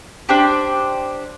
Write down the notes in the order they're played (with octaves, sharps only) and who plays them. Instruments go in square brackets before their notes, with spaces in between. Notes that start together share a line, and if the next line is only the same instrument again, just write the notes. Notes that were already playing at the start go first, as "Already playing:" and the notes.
[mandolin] D4 G4 C5